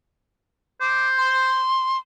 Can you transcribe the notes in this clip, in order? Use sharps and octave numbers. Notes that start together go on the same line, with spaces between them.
C5 D6
C6